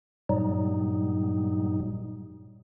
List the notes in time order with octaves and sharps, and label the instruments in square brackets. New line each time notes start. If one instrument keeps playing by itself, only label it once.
[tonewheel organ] G2 A#2 F#3 G3 D#4